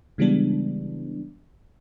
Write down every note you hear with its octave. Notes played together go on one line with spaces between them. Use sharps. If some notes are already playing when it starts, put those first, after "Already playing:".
C#3 E3 G3 G#3 B3 D4